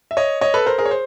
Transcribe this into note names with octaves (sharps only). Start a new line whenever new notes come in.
E5
C#5 D#5
C#5 D#5
A4 B4
A#4 C5
G#4 A#4
C#5
C5